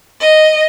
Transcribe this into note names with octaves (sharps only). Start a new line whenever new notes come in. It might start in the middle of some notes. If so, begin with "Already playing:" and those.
D#5